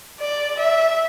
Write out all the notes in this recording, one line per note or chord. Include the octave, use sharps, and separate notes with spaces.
D5
E5